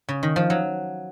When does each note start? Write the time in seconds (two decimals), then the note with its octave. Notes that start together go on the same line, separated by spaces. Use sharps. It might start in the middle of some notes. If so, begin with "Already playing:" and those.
0.08 C#3
0.23 D#3
0.36 F3
0.50 F#3